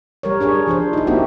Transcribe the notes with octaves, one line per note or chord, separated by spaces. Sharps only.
G3 A#4 C#5
D4 G#4 C#5
F3 D4 C5
D#4 E4
A#3 C4 F#4 G4